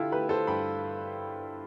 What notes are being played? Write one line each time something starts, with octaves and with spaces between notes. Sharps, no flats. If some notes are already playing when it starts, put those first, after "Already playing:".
Already playing: D3 E4 F4 G4 A4
A3 G4 B4
A4 C5
G2 G5 B5